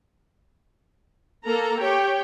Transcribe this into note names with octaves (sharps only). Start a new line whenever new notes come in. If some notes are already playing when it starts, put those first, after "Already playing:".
A#3 A4 A#5
G4 C#5 G5